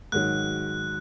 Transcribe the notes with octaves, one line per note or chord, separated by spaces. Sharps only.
G#2 D#3 F#3 F#6